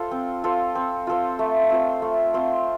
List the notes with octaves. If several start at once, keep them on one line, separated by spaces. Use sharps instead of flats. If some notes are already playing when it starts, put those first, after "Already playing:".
Already playing: F4 A4 C5
C4
F4 A4 C5
C4
F4 A4 C5
A3
C4 F4 C5
A3
C4 F4 C5